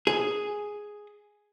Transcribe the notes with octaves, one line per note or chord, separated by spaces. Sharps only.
G#4